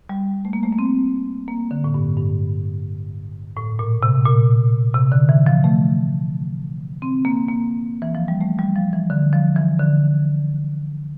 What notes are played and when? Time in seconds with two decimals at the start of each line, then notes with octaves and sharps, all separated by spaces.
0.09 G3
0.45 A3
0.53 A#3
0.63 A3
0.73 A#3
0.79 C4
1.48 A#3
1.71 D3
1.84 A2
1.94 G2
2.17 G2
3.56 A2
3.79 A#2
4.03 C3
4.25 A#2
4.95 C3
5.12 D3
5.29 E3
5.46 F3
5.64 A3
7.02 C4
7.25 A#3
7.49 A#3
8.02 E3
8.15 F3
8.28 G3
8.41 A3
8.59 G3
8.76 F3
8.93 E3
9.10 D3
9.33 F3
9.56 E3
9.79 D3